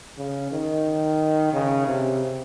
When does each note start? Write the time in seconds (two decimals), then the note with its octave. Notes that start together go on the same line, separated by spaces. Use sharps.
0.18 C#3
0.52 D#3
1.53 C#3
1.87 C3